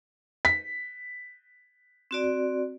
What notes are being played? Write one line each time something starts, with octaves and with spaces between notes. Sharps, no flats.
B6
C4 F#4 D5